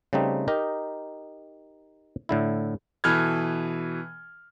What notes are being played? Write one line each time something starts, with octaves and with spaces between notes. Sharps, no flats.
C#3 G3 A3 C4 D#4
D#4 G4 A#4 D#5
A2 D3 E4
B2 E3 A4 B5 F6 G#6